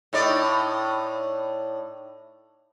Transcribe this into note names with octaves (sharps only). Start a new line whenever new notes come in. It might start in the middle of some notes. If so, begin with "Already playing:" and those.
A2 D#4 D5